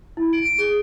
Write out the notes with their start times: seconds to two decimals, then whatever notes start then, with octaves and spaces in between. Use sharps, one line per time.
0.17 E4
0.33 D7
0.45 D7
0.59 G#4